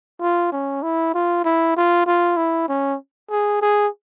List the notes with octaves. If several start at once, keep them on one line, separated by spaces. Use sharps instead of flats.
F4
C#4
E4
F4
E4
F4
F4
E4
C#4
G#4
G#4